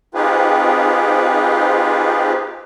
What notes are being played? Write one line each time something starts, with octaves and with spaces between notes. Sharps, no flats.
C4 D#4 F4 G4 G#4 B4